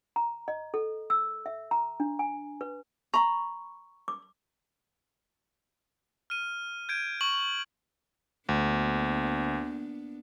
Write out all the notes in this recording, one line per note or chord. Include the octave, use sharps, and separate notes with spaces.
A#5
D#5
A4
E6
E5
A#5
D4
G#5
B4
A#5 B5 C#6
D6
F6 D#7
G6 G#6 D7
C#6 F#7
D2 A#3 B3 D4